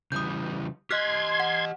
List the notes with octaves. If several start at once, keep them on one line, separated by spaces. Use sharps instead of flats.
C#3 E3 G3 D#6 G6
G4 D#5 C6 F6 F#6 G#6 B6
F#5